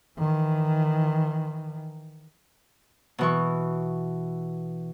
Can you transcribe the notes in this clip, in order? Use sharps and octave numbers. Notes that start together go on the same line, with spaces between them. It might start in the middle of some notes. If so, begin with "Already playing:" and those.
D#3 E3
B2 E3 C#6